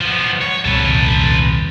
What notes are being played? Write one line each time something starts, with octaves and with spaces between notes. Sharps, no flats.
F3 B3
C#5
D#1 C2 F2 A4 B4